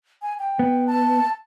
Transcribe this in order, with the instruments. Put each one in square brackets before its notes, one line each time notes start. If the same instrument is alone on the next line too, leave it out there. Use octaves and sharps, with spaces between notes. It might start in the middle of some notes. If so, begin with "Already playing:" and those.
[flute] G#5
G5
[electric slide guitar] B3
[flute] A5